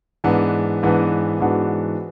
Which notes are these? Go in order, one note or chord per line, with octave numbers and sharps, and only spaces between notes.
G#2 E3 B3 D4
G#2 E3 B3 D4
G#2 E3 B3 D4 F#4